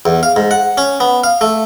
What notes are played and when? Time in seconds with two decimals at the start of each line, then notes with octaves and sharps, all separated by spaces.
0.05 E2
0.23 F5
0.36 G#2
0.51 F#5
0.78 C#4
1.00 B3
1.24 F5
1.41 A3